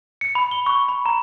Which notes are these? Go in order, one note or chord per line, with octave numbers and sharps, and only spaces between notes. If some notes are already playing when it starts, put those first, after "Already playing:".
C#7
B5
G7
C#6
B5
A#5